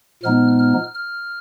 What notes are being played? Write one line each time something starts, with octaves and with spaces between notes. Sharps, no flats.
A#2 F3 G#3 B3 D#4 F6
F6
F6